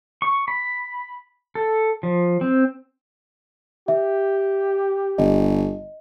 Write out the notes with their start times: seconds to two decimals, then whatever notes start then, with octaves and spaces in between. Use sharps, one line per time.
0.22 C#6
0.48 B5
1.55 A4
2.03 F3
2.41 C4
3.88 G4 E5
5.18 G1 D#5